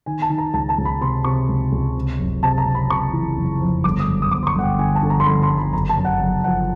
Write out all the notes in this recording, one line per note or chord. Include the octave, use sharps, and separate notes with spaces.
D#3 G#5
A5
D#3
A#5
C#2 A5
A5
C#2
B5
C3 C6
C3 C#6
C#2
C#2
C3
F#1
C3 A5
A#5
C3
B5
C3 C#6
E3
F#1
F2
G1 D6
D#6
F#2
D#6
G1 D6
C6
C#6
G1 F#5
G5
D3 G#5
A5
D3
A#5
C6
G1 B5
C6
G1
B5
F#1 A#5
A5
F#2
F#5
F#1 F#5
F3 F#5